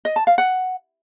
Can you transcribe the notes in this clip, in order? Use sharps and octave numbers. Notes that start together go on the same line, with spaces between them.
D#5
A5
F5
F#5